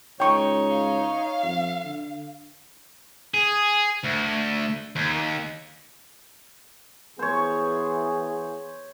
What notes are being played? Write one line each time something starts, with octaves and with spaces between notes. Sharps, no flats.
C#2 D#4 C#5 G5 C#6
F5
F2
D3
G#4
D2
D#2
E3 B3 G#4 C5 C#5